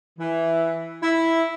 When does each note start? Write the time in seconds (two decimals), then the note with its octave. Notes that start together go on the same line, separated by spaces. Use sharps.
0.19 E3
1.02 E4